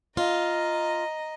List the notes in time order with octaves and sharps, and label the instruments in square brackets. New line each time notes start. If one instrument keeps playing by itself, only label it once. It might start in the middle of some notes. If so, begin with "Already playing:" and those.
[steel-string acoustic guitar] F4 [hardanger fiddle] D#5 A#5